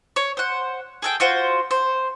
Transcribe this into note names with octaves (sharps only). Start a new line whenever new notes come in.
C#5
C5 F#5
G#4 A4 G5
F4 F#4 C5
C5